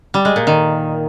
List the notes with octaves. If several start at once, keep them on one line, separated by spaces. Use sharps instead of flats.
G3
G#3
A#2
D#3